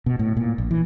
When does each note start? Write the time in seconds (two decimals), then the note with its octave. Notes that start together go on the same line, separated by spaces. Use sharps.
0.06 B2
0.19 A2
0.37 A#2
0.58 A#1
0.71 E3